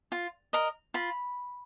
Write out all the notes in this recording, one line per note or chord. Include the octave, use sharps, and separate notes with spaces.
F4
A#4 D#5
F4 B5